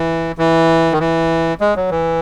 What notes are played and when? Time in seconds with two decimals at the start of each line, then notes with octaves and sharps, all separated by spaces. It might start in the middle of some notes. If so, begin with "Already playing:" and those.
Already playing: E3
0.38 E3
0.92 D#3
0.99 E3
1.61 G#3
1.76 F#3
1.91 E3